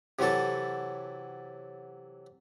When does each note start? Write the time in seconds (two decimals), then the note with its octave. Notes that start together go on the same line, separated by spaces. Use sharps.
0.19 C3 E3 F#3 A4 A5